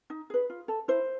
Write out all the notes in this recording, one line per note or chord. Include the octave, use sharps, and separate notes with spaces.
D#4
G#4 B4
F4
A4
E4 C5